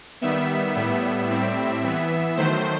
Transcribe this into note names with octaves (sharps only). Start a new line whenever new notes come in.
D#3 G3 B3 E5
A2 G3 B3
A2 G3 C4
E3 B3
D#3 F#3 A3 C5